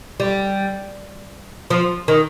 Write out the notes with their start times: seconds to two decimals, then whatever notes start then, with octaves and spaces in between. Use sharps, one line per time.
0.20 G3
1.70 F3
2.08 D#3